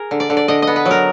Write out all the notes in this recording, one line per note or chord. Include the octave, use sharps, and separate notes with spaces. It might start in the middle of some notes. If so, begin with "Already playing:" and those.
Already playing: G#4 A#4
D3
D5
D3
D5
D3 D#5
B3 D#5
B4
F#3
A#4